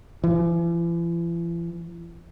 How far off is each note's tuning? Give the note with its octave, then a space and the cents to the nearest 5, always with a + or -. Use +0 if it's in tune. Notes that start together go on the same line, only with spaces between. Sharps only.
E3 +45